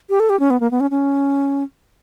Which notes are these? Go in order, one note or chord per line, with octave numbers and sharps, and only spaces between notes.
G4
A4
G4
C#4
B3
A#3
B3
C#4
C#4